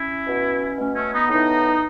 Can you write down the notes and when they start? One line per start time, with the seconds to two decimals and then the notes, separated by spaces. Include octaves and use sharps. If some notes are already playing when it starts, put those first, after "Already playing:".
Already playing: C#4 E4
0.26 B2
0.78 B2 A3 C#4
0.95 A3 C#4
1.12 B3 D#4
1.29 A2 E3 B3 D#4